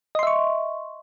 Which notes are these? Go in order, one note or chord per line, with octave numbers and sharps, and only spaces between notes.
D#5 E5 C6 C#6